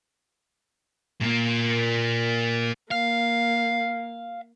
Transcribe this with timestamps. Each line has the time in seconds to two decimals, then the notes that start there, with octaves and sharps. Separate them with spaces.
1.21 A#2 A#3
2.91 A#3 F5